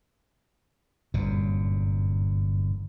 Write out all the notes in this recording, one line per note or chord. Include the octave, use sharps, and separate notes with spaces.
G1 F#2 A#2